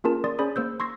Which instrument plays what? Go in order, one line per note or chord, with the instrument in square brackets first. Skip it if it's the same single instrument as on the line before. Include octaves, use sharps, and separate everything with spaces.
[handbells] A#3 C#4 F4 G#4 A#4 A5
D5 C6 D#6 A6
C#4 G#4 C5 D5 B5 D#6
A#3 C5 E6 G6
C6 C#6 E6 G#6 A#6 C7